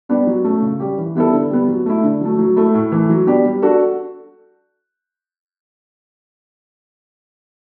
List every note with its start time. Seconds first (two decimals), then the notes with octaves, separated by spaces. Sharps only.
0.09 G3 B3 D4 G4
0.27 F#3
0.44 A3 C#4
0.62 C#3
0.80 G3 C#4 G4
0.98 E3
1.15 G3 B3 E4 A4
1.33 D3
1.50 G3 B3
1.68 F#3
1.86 A3 E4
2.03 D3
2.21 F#3 A3
2.39 F#3
2.56 A3 E4 A4
2.74 A2
2.92 E3 A3
3.10 F#3
3.27 B3 D4 G4
3.45 G3
3.62 D4 F#4 A4